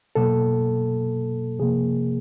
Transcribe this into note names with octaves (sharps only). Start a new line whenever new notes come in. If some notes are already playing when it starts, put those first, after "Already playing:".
B2 F#3 A#3 A4
C3 F3 A#3 G#4